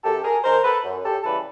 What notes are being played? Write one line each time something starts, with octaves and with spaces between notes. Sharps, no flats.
F#2 G4 A4
G#4 A#4
D#3 G#3 A#4 C5
A4 B4
F#2
G4 A4
C#3 E3 G3 A4 B4